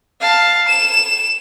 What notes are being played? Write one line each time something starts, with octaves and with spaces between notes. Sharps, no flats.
F5 A5
E7